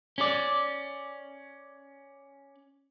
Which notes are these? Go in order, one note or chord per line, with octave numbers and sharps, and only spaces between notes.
C#4 D5